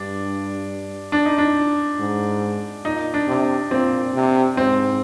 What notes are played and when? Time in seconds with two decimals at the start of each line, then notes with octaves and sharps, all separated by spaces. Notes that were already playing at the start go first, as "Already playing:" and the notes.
Already playing: G2 D4
1.12 D4
1.26 D#4
1.38 D4
1.99 G#2
2.85 A#2 D#4
3.14 D4
3.27 C3
3.71 A#2 C4
4.14 C3
4.57 G#2 C4